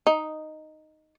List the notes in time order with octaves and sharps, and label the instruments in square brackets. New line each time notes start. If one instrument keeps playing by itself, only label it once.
[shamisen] D#4